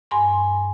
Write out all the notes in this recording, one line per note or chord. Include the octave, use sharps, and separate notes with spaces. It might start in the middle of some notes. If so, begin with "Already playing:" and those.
G2 G#5 C6